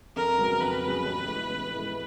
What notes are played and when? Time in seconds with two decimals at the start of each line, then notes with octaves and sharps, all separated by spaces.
0.16 F2 A#4
0.38 C#3 F#3 B3
0.60 F2 B4
0.83 C#3 F#3 B3
1.06 A1
1.27 A2 E3 G#3 B3
1.50 A1
1.72 A2 E3 G#3 B3